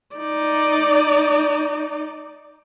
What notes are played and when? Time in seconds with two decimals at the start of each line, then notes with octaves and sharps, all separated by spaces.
0.16 D#4 D5